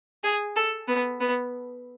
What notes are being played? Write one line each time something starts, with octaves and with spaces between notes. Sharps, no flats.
G#4
A4
B3
B3